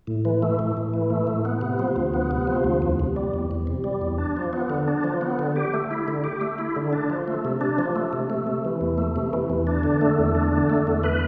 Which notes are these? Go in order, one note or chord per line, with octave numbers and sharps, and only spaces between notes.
A2
E3
A3
A2
A2
E3
A3
A2
B3
C3
F3
D2
B3
C3
F3
D2
E2
C3
G3
E2
E2
C3
G3
E2
D4
F3
B3
D3
D4
F3
B3
D3
G4
A3
E4
D3
G4
A3
E4
D3
D4
F3
A3
C3
D4
F3
A3
C3
A3
C3
E3
E2
A3
C3
E3
E2
D4
D3
A3
E2
D4
D3
A3
E2
B4